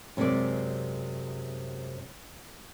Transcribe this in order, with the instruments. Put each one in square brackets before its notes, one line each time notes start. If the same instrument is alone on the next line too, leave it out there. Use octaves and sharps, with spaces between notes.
[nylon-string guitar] F#2 C3 E3 G#3 D5